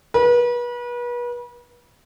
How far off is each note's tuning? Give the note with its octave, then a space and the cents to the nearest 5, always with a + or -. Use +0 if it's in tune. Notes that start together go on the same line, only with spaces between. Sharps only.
B4 -35